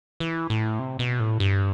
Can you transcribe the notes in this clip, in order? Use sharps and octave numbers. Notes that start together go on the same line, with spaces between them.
E3
A2
C3
B2
A2
G2